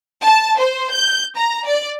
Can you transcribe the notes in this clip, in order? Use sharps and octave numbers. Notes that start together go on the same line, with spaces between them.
A5
C5
G6
A#5
D5